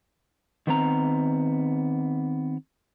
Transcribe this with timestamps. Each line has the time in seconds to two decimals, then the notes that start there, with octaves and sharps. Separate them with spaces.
0.67 D#3 B3 C4 A#5